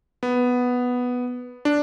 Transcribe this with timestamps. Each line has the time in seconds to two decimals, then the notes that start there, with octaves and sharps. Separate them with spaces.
0.23 B3
1.65 D4